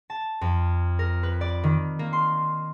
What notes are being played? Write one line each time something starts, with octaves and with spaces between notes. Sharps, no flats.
A5
F2
A#4
B4
D5
D#3
A#3
C6